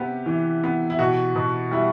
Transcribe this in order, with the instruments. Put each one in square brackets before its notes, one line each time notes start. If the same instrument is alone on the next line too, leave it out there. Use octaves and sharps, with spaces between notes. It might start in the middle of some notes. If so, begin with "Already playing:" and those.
Already playing: [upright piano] C3 B3 G4
E3
B3
E4
B2 F#4
B2
G3 E4